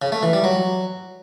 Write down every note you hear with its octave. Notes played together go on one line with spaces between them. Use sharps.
C#3
A3
E3
G3
F#3